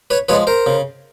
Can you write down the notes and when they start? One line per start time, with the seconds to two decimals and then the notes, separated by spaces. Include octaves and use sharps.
0.10 B4 C#5
0.29 F3 G#3 B4 C#5
0.47 A#4 C5
0.66 C#3